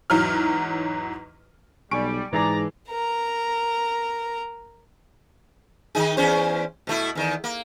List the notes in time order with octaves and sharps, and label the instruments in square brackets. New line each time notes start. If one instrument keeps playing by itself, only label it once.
[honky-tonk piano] E2 G#2 F#3 F6
[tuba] B1 [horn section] G3 [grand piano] G#5 C#6 D7
[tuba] G#2 [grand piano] E3 G#4 [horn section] D4 D5 A#5
[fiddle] A#4 A#5
[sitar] D#3 D#4 G#4
E2 C#4 C5
B2 A3 E4
E2 D#3
A#3